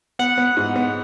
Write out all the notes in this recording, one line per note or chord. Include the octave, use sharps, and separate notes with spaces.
B3 F#5
B3
G#2
B3